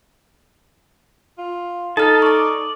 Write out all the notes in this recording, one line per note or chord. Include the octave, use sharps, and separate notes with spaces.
F4
D#4 A4 A5 F6
D5 C#6 D6